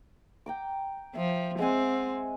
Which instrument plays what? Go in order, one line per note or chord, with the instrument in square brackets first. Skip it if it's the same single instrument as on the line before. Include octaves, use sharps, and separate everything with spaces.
[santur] G5 A#5 D6
[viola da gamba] F3 [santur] E5
[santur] G#3 F#5 G#5 [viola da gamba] C4